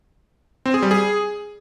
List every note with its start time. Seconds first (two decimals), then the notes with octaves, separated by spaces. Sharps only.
0.66 C4
0.74 G#4
0.82 G3
0.91 G#4